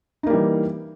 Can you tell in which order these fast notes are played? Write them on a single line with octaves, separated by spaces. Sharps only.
D#4 A#3 G3 E3